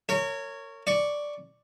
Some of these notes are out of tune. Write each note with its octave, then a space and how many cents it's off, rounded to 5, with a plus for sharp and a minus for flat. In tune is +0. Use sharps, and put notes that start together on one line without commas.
A#4 -30 C#5 +0
D5 +0 C#6 +5